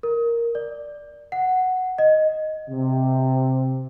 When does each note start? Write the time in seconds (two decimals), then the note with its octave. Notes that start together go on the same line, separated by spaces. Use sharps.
0.03 A#4
0.55 D5
1.32 F#5
1.98 D#5
2.69 C3